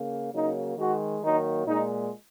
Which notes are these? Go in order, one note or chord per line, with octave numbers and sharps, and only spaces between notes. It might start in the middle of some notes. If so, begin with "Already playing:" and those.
Already playing: C#3 A#3
C#3 F#3 A#3 D#4
D#3 G#3 F#4
D#3 F#3 A#3 D#4
A#2 G#3 D#4